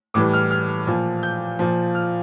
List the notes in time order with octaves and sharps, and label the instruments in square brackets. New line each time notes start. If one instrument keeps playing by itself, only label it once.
[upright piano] A2 E3 G3 D6
F6
F6
A#2 F3
G6
A#2 F3
F6